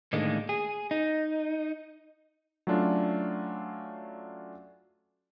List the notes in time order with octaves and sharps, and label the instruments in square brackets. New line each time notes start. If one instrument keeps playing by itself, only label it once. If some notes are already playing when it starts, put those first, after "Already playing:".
[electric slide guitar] A2 D3 D#3 G#3 A#3
G#4
D#4
[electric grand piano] F#3 A3 C#4 D4 F4